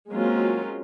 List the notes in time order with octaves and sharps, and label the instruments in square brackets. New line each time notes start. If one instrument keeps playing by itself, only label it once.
[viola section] F#3 G#3 A#3 C4 C#4 F4